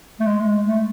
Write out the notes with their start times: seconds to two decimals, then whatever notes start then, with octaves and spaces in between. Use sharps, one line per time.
0.20 A3
0.26 G#3
0.41 A3
0.47 G#3
0.66 A3